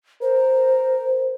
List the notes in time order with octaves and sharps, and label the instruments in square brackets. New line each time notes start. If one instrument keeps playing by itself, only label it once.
[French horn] A#4 [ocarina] C5